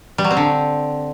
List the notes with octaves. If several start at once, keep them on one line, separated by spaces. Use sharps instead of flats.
G3
F#3
C4
D3